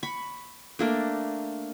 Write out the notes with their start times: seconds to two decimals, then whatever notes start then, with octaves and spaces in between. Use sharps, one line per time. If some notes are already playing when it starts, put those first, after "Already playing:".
0.03 B5 C#6
0.79 A3 A#3 D4